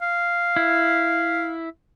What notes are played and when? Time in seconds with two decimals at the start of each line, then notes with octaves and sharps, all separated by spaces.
0.02 F5
0.56 E4